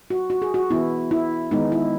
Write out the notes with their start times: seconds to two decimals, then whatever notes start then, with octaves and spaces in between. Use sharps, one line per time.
0.10 F#4
0.30 F#4
0.42 G#4
0.54 F#4
0.71 E3 B3 E4
1.11 E4
1.51 D#3 G#3 B3 D#4
1.72 E4